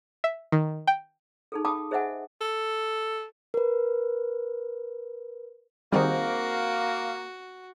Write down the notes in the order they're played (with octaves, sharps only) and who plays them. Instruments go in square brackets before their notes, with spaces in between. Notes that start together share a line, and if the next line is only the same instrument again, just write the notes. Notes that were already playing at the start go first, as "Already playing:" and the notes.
[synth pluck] E5
D#3
G5
[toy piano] D#4 G#4 A4
F5 G5 A5 B5 D6 D#6
G#4 C5 D#5 E5 F#5 G#5
[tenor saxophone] A4
[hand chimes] A#4 B4
[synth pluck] D#3 G3 [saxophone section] A#3 [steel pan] C4 D#4 G#4 [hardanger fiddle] F#4